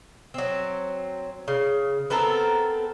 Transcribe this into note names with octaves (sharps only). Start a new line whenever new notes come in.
F#3 C4
C#3
B3 C4 A4 A#4